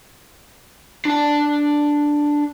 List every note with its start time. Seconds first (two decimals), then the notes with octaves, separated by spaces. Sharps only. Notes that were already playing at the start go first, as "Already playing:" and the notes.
1.05 D4 A5